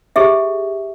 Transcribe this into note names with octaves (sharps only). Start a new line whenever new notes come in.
G4 G#4 E5